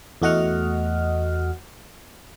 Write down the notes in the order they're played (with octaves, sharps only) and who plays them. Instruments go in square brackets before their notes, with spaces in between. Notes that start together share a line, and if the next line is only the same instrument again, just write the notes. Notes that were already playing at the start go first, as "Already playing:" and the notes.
[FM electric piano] E2 A3 F#4 D#5 F#5 F6